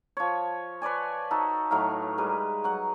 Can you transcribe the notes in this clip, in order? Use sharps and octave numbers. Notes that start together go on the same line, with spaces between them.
F3 C#5
B4 C#5 D5 G#5
D#4 F#4 A4
A2 F#3 D#4 F5
G3 G#3 B4
F#3 F#5